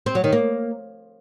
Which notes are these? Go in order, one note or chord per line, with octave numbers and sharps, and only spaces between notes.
C4
F#3
D#3
A#3